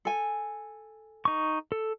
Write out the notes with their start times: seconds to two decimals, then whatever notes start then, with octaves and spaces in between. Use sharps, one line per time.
0.05 A4 G#5
1.25 D#4 C#6
1.72 A4